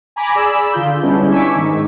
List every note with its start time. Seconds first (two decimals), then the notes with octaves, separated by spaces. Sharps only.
0.16 G#5 A#5 B5 D6 G#6 A#6
0.35 G#4 D5 B5 E6
0.73 D3 F4 G6
1.01 G3 G#3 B3 C#4 D4 E4
1.29 G#5 C#6 D6 E6 B6
1.54 G#2 D#3 D#4